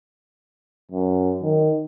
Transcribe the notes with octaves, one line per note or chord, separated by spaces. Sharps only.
F#2
D#3